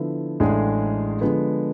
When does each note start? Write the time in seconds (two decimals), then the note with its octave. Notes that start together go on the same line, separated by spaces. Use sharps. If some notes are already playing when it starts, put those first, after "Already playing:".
Already playing: D3 F3 B3 E4
0.40 A1 A2 G#3 D4 G#4
1.21 D3 F3 G#3 B3